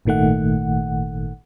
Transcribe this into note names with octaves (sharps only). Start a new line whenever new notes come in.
G#1 A#2 D#3 A3 F#5